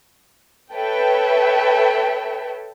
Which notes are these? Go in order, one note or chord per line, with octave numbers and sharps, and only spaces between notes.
A4 B4 C#5 E5 G5